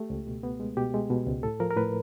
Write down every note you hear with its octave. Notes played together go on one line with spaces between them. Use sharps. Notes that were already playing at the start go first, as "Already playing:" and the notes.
Already playing: A3 G4
C#2
B2
B3
G#3
B2 G4
G#3
B2
C#2
A2 A4
F3 A#4
A#4
A2 B4